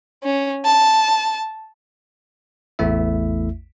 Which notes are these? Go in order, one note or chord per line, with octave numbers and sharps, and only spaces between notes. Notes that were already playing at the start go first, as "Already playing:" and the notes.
C#4
A5
A1 E2 A3 E4 E5